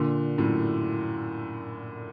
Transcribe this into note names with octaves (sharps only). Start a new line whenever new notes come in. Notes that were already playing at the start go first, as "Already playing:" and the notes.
Already playing: A#2 D3
F#2 A2